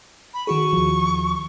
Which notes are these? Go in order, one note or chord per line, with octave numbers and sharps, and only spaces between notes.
B5
D#3 F#4 G#4 C#6
D#2 F3